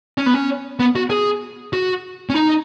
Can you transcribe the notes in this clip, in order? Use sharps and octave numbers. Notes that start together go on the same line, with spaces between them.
C#4
B3
C#4
B3
F#4
G#4
F#4
C#4
D#4